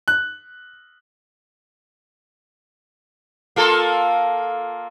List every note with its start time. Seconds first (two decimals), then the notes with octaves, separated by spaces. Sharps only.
0.08 F#6
3.56 A#3 F4 A4